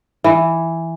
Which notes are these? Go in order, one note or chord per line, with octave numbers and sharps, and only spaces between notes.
E3